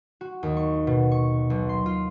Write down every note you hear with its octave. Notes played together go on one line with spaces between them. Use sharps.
F#4
D#2
C#6
B2
C#6
B1
C6
F4